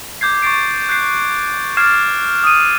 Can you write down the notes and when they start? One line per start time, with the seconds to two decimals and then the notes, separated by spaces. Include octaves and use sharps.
0.21 D6 G6 G#6 C7
0.42 C#6 G#6 A6 C7 D7
0.89 F#6 G6 C7
1.77 D6 F6 G#6 A6 C7 E7
2.44 D#6 D#7